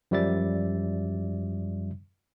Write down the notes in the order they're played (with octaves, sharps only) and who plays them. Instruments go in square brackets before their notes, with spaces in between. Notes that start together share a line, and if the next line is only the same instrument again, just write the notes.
[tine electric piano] F#2 F3 G3 D5 E5 A6